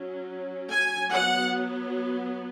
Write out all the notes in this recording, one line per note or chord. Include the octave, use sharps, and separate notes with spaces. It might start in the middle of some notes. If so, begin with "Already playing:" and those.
Already playing: F#3 C#4
G#5
F#3 B3 F#5